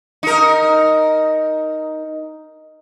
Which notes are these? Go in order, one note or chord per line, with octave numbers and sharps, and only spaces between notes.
D#4 A#4